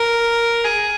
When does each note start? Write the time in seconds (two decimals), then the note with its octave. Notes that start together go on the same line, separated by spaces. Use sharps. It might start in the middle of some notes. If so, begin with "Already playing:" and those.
Already playing: A#4
0.65 G#4